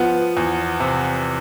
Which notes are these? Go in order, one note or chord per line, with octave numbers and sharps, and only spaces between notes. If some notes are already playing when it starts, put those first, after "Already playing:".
Already playing: F3 B3
E2
C3